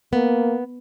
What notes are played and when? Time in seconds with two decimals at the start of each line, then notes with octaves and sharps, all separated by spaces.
0.13 A#3 B3